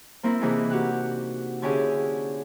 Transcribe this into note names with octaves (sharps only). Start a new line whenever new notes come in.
A#3 C4 E4 A#4
C3 E3 A#3 D4 D#4 G#4
F#4 G4 F#6
D3 C#4 E4 G4 G#4